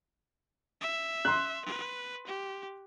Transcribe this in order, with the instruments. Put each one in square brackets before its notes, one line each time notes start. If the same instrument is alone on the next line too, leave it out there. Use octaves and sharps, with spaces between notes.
[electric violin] E5
[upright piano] C6 F#6
[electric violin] B4
G4